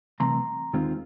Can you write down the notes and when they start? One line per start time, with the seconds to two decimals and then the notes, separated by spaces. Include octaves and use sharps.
0.20 C2 C3 E3 A3 A#5 C6
0.73 D#2 D#3 G#3 C4 F4